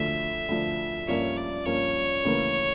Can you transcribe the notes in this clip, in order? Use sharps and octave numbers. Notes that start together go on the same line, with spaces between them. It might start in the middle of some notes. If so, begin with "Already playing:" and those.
Already playing: D2 D3 F3 E5
D2 D3 F3
G2 F3 A#3 C#4 C#5
D5
G2 F3 A#3 C#4 C#5
D2 C#3 E3 A#3